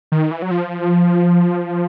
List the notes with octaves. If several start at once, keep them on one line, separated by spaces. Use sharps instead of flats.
D#3
E3
F#3
F3